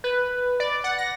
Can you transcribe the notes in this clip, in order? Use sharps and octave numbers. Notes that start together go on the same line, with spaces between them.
B4
D5
F#5
A#6